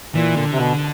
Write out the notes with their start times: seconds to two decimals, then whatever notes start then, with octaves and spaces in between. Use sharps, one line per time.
0.15 A#2 E3
0.37 D3
0.52 C3
0.58 B2